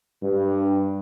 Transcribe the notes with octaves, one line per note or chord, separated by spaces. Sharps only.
G2